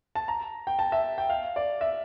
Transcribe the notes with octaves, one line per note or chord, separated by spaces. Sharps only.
A5
A#5
G5
A5
E5
G5
F5
D5
E5